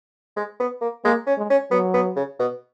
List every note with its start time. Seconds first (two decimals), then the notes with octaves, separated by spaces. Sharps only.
0.36 G#3
0.60 B3
0.81 A#3
1.05 G#3 A#3
1.27 C#4
1.38 G#3
1.50 C#4
1.71 F#3 B3
1.94 B3
2.16 C#3
2.40 B2